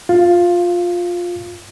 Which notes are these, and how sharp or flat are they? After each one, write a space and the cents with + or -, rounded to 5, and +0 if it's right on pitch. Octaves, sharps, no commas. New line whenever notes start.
F4 +15 F5 -10